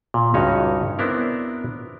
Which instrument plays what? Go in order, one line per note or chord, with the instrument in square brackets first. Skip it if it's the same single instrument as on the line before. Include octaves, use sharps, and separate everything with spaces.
[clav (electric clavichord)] A#2
C#2 G2 C#4 D#4 F#4 C#5
B3 C4 D4 E4 A#4